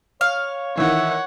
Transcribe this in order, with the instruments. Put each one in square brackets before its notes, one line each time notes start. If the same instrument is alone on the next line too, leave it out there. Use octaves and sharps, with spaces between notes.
[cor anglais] C#5 [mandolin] F5
[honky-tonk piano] D#3 E3 [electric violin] C#5 F#5 [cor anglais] E5